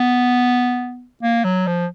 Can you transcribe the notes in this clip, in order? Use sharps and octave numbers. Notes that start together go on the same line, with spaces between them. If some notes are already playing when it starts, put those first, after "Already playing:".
Already playing: B3
A#3
F#3
F3